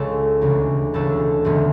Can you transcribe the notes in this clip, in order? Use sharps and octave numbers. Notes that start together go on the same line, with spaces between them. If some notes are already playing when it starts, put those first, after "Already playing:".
Already playing: C#2 C#3 G#3 A4
E1 D2 C#3
E1 D2 C#3 A4
E1 E2 D3 G#3